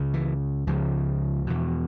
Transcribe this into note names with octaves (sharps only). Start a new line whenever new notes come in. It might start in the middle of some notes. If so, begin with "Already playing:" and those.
Already playing: C#2 C#3
E3
C#2 C#3 F3
E2 B2